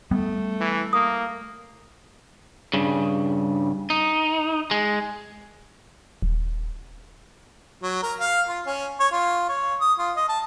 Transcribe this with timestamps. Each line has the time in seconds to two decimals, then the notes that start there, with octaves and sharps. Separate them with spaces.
0.11 G3 A3 B3
0.60 E3
0.93 A#3 D#6
2.73 G2 C#3
3.90 D#4
4.71 G#3
6.22 D#1
7.82 F#3
8.03 A#4
8.20 F5
8.48 F4
8.66 C#4
8.99 C#5
9.12 F4
9.49 C#5
9.81 D#6
9.98 F4
10.16 D#5
10.29 A5